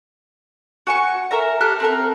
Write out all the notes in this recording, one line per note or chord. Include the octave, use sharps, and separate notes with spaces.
F#4 G#5 C#6
A#4 E5 A#5
G4 A4 F6 F#6
C4 A4 A#4